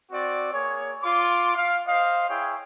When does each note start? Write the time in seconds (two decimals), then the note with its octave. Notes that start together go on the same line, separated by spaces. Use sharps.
0.12 C4 F#4 D5
0.53 A#3 G#4 C#5
1.03 F4 C6 D6
1.55 F5
1.86 C5 D#5 F5
2.28 E4 G#4 C#5 G5